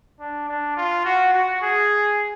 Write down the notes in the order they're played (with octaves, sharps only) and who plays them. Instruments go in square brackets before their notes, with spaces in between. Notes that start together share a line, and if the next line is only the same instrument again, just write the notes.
[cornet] D4
D4
F4
F#4
F#4
G#4